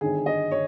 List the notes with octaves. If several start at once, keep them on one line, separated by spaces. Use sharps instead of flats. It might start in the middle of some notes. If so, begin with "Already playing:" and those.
G1 G2 D#3 G#4
D#5
C#5